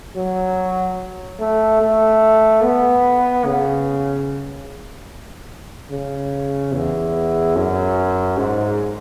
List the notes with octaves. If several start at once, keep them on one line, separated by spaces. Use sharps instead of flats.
F#3
A3
A3
B3
C#3
C#3
E2
F#2
G#2